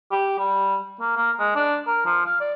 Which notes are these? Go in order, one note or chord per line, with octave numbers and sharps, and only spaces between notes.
G4
G3
A#3
A#3
G#3
D4
A#4
F3
F5
D5